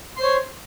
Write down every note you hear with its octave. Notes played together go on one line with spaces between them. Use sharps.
C5 C#5 C6